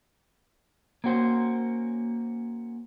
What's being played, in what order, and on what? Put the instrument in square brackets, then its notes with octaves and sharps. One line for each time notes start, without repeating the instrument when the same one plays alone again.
[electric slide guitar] A#3 C#4 F#4 C5